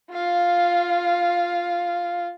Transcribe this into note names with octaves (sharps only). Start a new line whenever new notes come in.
F4 F5